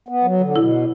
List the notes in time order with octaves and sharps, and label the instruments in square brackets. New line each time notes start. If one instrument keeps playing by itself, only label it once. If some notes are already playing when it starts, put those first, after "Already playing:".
[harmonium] B3
F#3
D3
[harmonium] B2 [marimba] E4